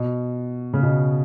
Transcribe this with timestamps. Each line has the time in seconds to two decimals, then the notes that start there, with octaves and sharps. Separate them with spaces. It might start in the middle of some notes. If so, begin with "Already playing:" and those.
Already playing: B2
0.73 C#3
0.83 B2